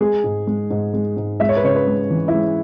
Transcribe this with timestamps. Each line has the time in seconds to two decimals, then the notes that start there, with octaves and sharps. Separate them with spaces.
0.01 G#3 G#4
0.24 G#2
0.47 G#3
0.70 G#2
0.94 G#3
1.17 G#2
1.40 G#3 E5
1.49 C#5
1.57 B4
1.64 C#3 C#5
1.76 B4
1.87 G#3
2.10 E3
2.28 E4
2.33 G#3